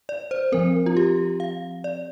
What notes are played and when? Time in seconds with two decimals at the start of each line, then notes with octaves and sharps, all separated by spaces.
0.09 D5
0.31 C5
0.52 F3 C4 A#4
0.86 F4
0.97 G4
1.40 F5
1.84 D5